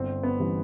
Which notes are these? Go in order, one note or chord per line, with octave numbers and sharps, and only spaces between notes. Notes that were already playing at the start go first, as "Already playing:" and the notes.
Already playing: G1 C4
B3
F#2 E3 G3